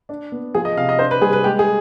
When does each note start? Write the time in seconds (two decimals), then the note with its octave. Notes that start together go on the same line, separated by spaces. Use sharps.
0.09 D4
0.32 B3
0.55 F3 G#4
0.65 D#5
0.77 C3 F5
0.89 D#5
0.99 D4 C5
1.11 B4
1.21 G3 G#4
1.33 B4
1.44 G#3 G4
1.59 G#4